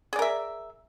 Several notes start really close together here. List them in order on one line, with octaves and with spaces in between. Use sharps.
G#4 D5 A#4 E5